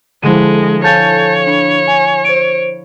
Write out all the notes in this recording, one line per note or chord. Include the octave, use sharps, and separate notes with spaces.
D3 F3 G#3 E4 D#7
A4 C#5 F5 G#5 A5 G6 A6
D4 B5 C#7
G#5
C5 D7